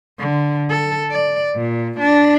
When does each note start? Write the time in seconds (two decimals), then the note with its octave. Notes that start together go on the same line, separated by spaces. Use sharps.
0.19 D3
0.70 A4
1.11 D5
1.56 A#2
1.99 D4